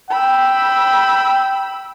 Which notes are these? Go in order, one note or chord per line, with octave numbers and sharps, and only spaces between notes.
G5 B5 E6